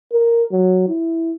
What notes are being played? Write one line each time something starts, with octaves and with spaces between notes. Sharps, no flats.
A#4
F#3
E4